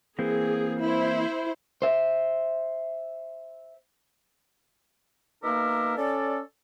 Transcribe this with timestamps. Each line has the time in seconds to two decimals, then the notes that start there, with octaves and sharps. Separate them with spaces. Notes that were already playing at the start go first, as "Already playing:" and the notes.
0.19 E3 A#3 C4 G#4
0.83 E4 C5
1.82 C5 E5
5.44 B2 A#3 D#4 A#4 E5 D6
5.97 C#4 A4 D5